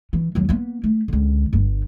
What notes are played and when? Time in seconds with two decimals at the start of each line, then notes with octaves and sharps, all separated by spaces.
0.13 E3
0.35 D#2 F#3
0.49 A#3 B3
0.84 A3
1.08 C#2 D3
1.53 G1 G2